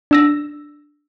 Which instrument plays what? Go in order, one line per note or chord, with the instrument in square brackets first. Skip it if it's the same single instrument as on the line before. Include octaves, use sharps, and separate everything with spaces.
[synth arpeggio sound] D4 E6 A#6